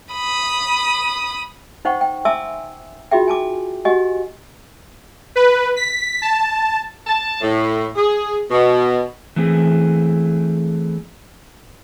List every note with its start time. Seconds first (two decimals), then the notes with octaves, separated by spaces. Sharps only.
0.13 B5 D#6
1.85 D#4 C5 F#5 G5 C#6
2.01 G5
2.25 E5 G#5 A5 C6 D6 E6
3.11 D#4 F4 F#4 G#4 E5 G5
3.28 G#5 A5 D6
3.85 F#4 G4 D#5 F#5 G#5
5.36 B4
5.76 B6
6.22 A5
7.07 A5
7.41 A2
7.96 G#4
8.51 B2
9.36 E3 A3 C4 G#4